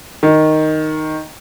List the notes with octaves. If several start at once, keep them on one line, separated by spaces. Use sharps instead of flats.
D#3